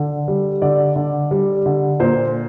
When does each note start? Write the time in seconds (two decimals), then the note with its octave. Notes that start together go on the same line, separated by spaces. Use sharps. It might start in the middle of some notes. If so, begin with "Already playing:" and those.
Already playing: D3
0.28 G3
0.62 D3 D5
0.96 D3
1.31 G3
1.66 D3
2.00 A#2 C5